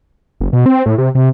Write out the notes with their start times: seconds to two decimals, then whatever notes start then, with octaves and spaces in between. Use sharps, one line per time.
0.41 F#1
0.53 B2
0.66 C4
0.86 A2
0.98 C3
1.15 C3